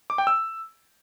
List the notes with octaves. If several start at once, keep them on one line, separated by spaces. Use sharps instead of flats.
D6
G5
E6